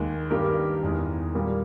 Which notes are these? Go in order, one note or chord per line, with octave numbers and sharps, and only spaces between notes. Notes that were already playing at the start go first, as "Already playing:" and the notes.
Already playing: D#2 D#3 G#3
G2 D#3 G3 A#3 G4 A#4
E2 D#3 G#3
A#2 G3 A#3